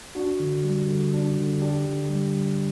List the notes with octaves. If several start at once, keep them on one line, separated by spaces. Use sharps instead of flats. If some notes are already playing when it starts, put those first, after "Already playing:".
D4 F#4
D3
G3
D3
D4
D3
D4 G4
D3
G3